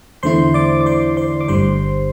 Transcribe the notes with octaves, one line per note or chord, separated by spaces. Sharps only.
E2 D3 A3 E4 C5 C6
D5 D6
D6
C5 C6
C5 C6
D6
G1 G2 D3 G3 C5 C6